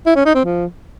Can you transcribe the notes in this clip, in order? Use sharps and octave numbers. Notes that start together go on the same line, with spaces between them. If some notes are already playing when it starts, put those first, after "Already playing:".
E4
C#4
D#4
C4
F3